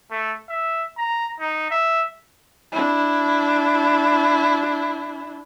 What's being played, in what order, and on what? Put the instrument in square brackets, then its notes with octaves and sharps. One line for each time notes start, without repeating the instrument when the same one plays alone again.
[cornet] A3
E5
A#5
D#4
E5
[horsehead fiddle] D4 E4